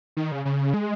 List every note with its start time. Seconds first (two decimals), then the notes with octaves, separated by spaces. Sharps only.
0.17 D#3
0.32 C#3
0.45 C#3
0.74 G#3